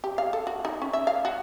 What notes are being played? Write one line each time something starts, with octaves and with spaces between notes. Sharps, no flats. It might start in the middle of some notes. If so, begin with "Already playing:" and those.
G4
F5
A4
F#4
D#4
C#4
E5
F5
F#4